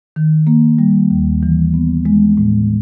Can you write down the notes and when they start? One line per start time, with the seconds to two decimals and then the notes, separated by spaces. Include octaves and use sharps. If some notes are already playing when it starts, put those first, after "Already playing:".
0.16 D#3
0.47 A#3
0.79 G3
1.11 D#2
1.43 E3
1.74 B3
2.05 G#3
2.37 A2